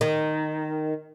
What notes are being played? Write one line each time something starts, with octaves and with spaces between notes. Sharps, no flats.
D#3